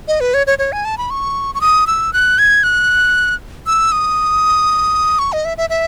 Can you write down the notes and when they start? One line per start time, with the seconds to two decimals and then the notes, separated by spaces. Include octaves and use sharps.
0.08 D#5
0.21 B4
0.34 C#5
0.47 C#5
0.59 C#5
0.72 G#5
0.85 A5
0.98 B5
1.10 C#6
1.55 C#6
1.61 D#6
1.87 E6
2.13 F#6
2.39 G#6
2.63 F#6
3.66 E6
3.92 D#6
5.19 C#6
5.32 D#5
5.45 E5
5.58 E5
5.70 E5